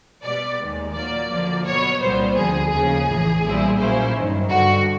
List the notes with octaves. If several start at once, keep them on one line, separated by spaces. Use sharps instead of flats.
B2 G3 B3 D5
D#2 D#3 G#3
A#2 F#3 A#3 D5
D2 D3 F3 A#3
B2 F#3 B3 C#5
C2 A#2 G3 B3 C5
D2 D3 F3 G#4
D#2 C#3 F3 G#4
A#1 A2 E3
B1 A#2 G3 C4 E4
A#2 F#3 A#3 C#4 E4 C5
G2 D#3 F#3
G2 D3 G3 F#4